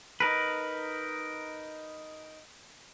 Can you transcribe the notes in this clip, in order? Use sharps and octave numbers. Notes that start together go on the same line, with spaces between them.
D#4 A#4 B4